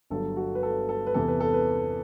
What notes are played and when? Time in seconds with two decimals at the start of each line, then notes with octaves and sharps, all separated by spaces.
0.10 G1 G2 F#3 A4
0.36 F#4
0.55 B4
0.63 A4
0.89 A4
1.07 B4
1.14 E2 C3 E3 A4
1.28 B4
1.40 A4
1.54 B4